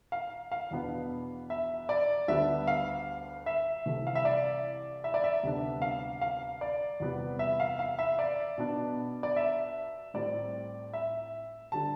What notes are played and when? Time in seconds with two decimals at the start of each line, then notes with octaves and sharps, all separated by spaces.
0.12 F5
0.52 F5
0.71 E2 B2 B3 D4
1.50 E5
1.89 D5
2.28 D2 D3 G3 B3 D4 E5
2.67 F5
3.46 E5
3.86 C2 C3 E3 A3
4.07 F5
4.15 E5
4.25 D5
5.04 E5
5.14 D5
5.24 E5
5.43 D2 C3 G3 B3 D4
5.82 F5
6.21 F5
6.61 D5
7.00 E2 C3 G3 B3
7.39 E5
7.60 F5
7.79 F5
7.99 E5
8.19 D5
8.58 B2 B3 D4
9.23 D5
9.36 E5
10.14 A2 G3 C4 D5
10.94 E5
11.72 D3 G3 D4 A5